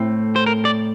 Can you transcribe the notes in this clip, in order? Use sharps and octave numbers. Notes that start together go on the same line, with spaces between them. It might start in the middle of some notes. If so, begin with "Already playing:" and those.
Already playing: A2 A3 C4
C5
A#4
D5